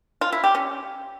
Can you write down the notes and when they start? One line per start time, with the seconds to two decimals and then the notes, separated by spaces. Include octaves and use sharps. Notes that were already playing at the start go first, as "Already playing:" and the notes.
0.21 F4
0.32 E4
0.44 G4
0.55 C#4